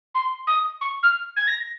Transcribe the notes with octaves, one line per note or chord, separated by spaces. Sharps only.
C6
D#6
C#6
F6
G#6
A#6